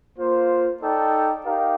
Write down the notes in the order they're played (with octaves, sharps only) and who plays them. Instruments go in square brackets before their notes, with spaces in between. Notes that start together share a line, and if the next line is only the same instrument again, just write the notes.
[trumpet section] A#3 F4 C5
D#4 A4 D5 G5
D#4 G4 A#4 F5